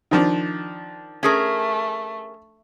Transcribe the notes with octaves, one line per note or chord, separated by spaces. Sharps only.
D#3 F3 D4
A3 C#4 G#4 A#4